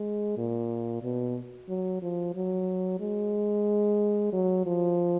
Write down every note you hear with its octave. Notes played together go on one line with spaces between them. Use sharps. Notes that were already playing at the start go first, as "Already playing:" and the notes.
Already playing: G#3
A#2
B2
F#3
F3
F#3
G#3
F#3
F3